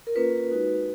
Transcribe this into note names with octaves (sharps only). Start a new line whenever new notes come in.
A#4
A#3 C#4 F4 B4
G#3 D#4 F#4